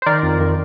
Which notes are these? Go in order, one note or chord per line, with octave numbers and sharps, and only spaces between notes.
C5
D#3 A#4 D5
F2
D#3